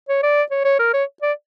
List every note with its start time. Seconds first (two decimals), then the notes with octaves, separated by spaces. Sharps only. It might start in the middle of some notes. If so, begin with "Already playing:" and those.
0.08 C#5
0.23 D5
0.51 C#5
0.64 C#5
0.79 A#4
0.94 C#5
1.22 D5